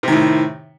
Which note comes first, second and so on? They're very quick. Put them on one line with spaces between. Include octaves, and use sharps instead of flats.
C3 D#3 A2